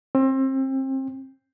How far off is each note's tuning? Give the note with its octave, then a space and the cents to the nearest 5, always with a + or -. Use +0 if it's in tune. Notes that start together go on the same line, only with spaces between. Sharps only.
C4 +30